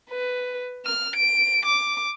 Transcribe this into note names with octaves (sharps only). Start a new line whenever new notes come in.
B4
F6
D7
D6